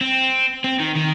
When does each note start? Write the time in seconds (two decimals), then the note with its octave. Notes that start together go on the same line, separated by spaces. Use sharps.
0.01 C4
0.64 C4
0.80 D#3
0.95 D#3